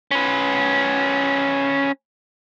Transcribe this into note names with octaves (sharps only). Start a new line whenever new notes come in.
C#4 B4